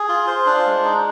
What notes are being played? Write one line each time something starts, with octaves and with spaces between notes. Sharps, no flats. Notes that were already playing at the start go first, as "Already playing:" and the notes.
Already playing: G#4
F4
C5
D4
G#3
D#4